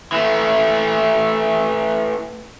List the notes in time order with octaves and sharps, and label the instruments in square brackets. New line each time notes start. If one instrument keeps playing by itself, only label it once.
[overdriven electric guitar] E3 A3